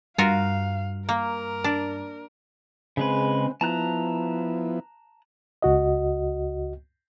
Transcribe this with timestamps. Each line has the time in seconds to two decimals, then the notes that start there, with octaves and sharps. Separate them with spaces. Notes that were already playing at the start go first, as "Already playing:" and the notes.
0.18 G2 F4 F#4 A#4 F5
1.09 A#3 A#4
1.64 D4
2.97 C#3 G#3 C4 B4
3.61 F3 B3 E4 A5 A#5 F#6
5.62 C#2 F#4 D#5